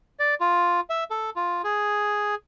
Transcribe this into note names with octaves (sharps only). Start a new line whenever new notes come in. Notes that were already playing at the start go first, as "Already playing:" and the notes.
D5
F4
E5
A4
F4
G#4